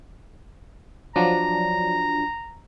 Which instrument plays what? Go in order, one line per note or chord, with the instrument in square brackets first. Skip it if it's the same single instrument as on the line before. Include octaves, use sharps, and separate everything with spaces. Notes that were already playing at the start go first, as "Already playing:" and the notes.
[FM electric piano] F3 F#3 D4 [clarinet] A#5